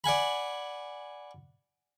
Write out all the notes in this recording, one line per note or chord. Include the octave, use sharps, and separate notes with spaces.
D5 F#5 G#5 B5